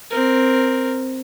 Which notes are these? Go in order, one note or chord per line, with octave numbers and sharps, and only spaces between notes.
C4 A#4